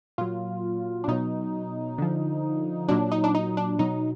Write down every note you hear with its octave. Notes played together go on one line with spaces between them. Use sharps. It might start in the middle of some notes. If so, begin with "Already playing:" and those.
A#2 F#3 F4
D4
B2 F#3 D#4
D3 F3
A#2 F#3 D4
D#4
D4
D#4
D4
B2 F#3 D#4